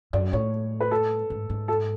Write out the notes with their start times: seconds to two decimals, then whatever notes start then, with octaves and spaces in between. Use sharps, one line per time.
0.13 F#2 D5
0.33 A2 C#5
0.80 B4
0.91 A4
1.30 G#2
1.50 G#2
1.68 A4